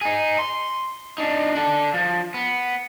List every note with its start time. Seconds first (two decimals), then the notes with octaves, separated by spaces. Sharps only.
0.01 D#4 G#4
0.39 C6
1.18 D4 D#4
1.55 D4 A4
1.94 F3
2.34 B3